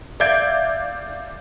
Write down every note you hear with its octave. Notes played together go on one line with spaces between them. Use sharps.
D5 E5 F5 G6 G#6 D7